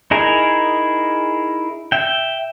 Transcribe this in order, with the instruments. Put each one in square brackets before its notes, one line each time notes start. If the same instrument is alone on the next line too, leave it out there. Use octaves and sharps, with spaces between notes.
[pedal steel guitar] D#4 E4 G#4 A#4 G#5
E5 G5